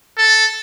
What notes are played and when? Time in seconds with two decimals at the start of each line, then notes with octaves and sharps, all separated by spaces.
0.18 A4